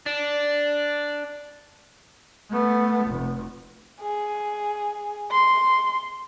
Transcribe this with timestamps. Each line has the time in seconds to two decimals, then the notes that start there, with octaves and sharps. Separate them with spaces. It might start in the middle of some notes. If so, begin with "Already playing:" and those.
0.06 D4
2.50 A3 B3
3.06 F1
4.01 G#4
5.31 C6